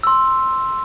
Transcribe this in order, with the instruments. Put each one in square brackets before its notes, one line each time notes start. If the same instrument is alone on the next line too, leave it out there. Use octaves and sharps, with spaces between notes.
[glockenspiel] C6 E6